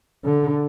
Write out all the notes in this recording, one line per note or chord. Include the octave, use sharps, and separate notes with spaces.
D3